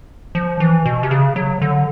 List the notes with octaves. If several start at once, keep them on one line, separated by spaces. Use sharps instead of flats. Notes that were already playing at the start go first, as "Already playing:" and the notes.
F3
E3
B2
C3
C#3
F#3
D3